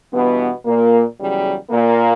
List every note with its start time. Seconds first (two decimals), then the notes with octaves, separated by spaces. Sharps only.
0.13 G2 B2 E3 B3
0.66 A#2 A#3
1.19 E2 C#3 F#3 G3
1.71 A#2 A#3